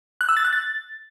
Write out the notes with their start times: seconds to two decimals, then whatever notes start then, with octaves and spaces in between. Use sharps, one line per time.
0.21 F#6
0.29 E6
0.37 A6
0.45 F#6
0.53 A6